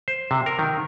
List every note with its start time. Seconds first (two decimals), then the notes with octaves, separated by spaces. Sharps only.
0.08 C5
0.31 C3
0.46 A#4
0.59 D#3